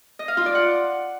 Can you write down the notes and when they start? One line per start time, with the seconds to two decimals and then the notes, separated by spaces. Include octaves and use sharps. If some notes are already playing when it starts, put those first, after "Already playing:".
0.19 D#5
0.28 F5
0.37 F4
0.46 D5
0.55 F#5